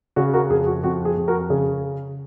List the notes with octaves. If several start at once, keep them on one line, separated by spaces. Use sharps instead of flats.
C#3 F#4
F#4 A#4
F2 G#4
F#4
F2 F#4
G#4
F2
F#4 A#4
C#3 G#4